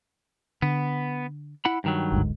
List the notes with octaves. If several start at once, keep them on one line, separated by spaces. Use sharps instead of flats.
D3 B3
E4 F#5 B5
G2 D#3 F#3
G1 D2 G#2